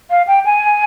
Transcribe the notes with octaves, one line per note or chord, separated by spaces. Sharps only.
F5
G5
G#5